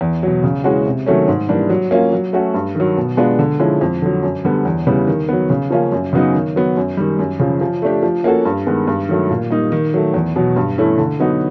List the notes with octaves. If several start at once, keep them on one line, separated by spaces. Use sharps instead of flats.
E2
B2 F#3
C#3
E3 G#3 C#4 F#4
C3
D#3 F#3 A3 C#4
G#2
E3 G3 A#3 D4
F#3
A#3 C#4 F4
F#3
A3 C#4 F#4 A4
G2
D#3 F#3
B2
G#3 B3 D4 F4
D3
F3 G#3 C#4 E4
F2
D3 F#3
F#2
D3 G3 B3
E2
C#3 E3 G3 B3
D#3
F#3 B3
C#3
F3 A#3 C#4 F4
F#2
C#3 F#3 B3 D#4
D#3
F#3 B3
F#2
D#3 G3
F#2
C#3 F3
F3
A3 D4 G4
F3
A#3 C#4 F#4 A4
G2
D#3 G#3 B3
G2
D#3 F#3 A3
A#2
G3 A#3 D#4
D#3
F#3 A3
E2
B2 F#3
G2
E3 A3 C#4 E4
D3
F#3 B3 D#4 F#4